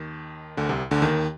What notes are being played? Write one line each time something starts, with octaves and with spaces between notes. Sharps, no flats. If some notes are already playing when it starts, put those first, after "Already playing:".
Already playing: D#2 D#3
D2 D3
C2 C3
D2 D3
D#2 D#3